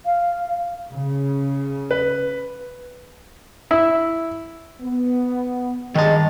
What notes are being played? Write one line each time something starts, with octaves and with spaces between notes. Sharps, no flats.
F5
C#3
B4
E4
B3
G2 D#3 G#3 D#5 A5